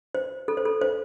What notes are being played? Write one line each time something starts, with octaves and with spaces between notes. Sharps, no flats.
C5
A4
C5
A4
C5